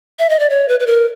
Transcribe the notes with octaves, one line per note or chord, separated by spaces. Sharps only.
E5
D#5
D5
C#5
B4
B4
A#4